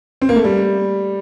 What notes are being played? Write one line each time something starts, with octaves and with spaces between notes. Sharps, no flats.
C4
A#3
A3
G3